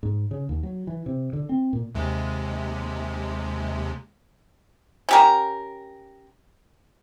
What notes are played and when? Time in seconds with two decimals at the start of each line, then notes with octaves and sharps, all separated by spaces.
0.03 G#2
0.31 C#3
0.49 D#2
0.63 F#3
0.87 E3
1.06 C3
1.33 D3
1.49 C4
1.73 A#2
1.95 D#2 C3 G#3
5.09 C#4 G4 A#4